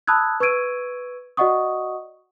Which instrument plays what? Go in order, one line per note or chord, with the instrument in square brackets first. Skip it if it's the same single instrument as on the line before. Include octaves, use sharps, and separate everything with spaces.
[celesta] A5 B5 D#6 E6 F#6 G#6
B4 C#6 E6 G#6 D7 D#7
F#4 D5 D#5 F#5 C#6 D#6